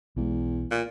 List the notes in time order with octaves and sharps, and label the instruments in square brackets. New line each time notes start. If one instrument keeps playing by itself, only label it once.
[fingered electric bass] B1 G#3 [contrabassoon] E2
[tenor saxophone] A#2